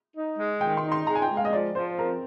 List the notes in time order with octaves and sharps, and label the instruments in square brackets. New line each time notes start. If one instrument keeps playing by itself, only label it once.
[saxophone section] D#4
G#3
[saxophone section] D#3 [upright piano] G5
[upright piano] C6
[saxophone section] D#4
[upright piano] C6
[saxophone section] G#3 [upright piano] A#5
[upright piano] G#5
G5
[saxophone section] G#3
[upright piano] F5
D#5
[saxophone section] F3 [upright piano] D5
[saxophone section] F3 [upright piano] C5
[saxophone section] C4 [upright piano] A#4